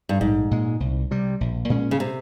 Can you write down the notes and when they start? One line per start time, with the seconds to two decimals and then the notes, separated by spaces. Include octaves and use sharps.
0.09 G2
0.21 A#1 G#2
0.51 A#2 G#3
0.80 C2
1.11 C3 G3
1.41 A#1
1.70 A#2 G#3 C#4
1.91 C#3
2.00 C3